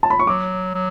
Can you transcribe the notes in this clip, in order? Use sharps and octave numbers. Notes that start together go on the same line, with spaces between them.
A5
B5
C#6
F#3 D6
F#3